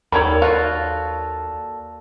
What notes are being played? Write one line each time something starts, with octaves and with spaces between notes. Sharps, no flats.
D#2 D#3 G3 A#3 A4 C#5 D5 B5
F4 F#4 F5